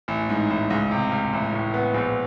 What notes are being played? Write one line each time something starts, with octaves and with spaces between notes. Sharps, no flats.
A1
G#2
A1
C#2
C3
C#2
A1
A2
B3
A#1